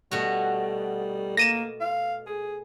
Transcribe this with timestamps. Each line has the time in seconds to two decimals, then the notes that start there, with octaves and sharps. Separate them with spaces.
0.11 B2 G3 A3 F#4
1.37 A#3 A#6 D#7 E7
1.80 F5
2.27 G#4